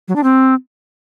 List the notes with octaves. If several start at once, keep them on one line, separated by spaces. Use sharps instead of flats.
F#3
D4
C4